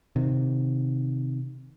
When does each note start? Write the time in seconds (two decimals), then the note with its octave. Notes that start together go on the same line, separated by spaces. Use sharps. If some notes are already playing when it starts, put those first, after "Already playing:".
0.16 C3 D#3